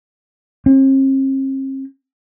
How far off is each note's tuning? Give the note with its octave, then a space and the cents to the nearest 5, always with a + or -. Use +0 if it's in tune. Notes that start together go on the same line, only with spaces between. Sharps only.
C4 +45